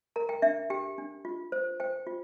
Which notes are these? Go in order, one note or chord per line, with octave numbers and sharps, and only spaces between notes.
A#4 A#5
G5
D4 E5
G4 G5
D4
F4
C5
C5 G5
F4